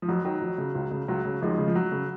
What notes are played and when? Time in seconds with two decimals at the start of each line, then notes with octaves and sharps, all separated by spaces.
0.02 F3
0.08 F2 F#3
0.25 D#3 F#3
0.41 F2
0.58 C#3
0.75 C#2
0.91 C#3
1.08 C#2 F#3
1.25 C#3
1.42 D#2 F3 G#3
1.58 C#3
1.68 F3
1.75 F#2 F#3
1.92 C#3